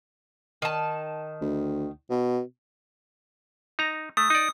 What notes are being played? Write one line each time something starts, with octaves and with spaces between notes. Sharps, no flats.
D#3 A5
D2
B2
D#4 A#5
A3 D#6
D#4 D5